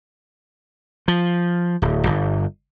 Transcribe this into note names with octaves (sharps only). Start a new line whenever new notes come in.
F3
D1
G1